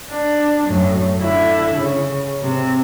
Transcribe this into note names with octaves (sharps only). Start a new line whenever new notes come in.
D4
F#2 A2
D3 E4
C#3
C3 C4